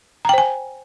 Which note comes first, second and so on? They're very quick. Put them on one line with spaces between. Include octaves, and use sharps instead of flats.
A#5 G5 C5 G#5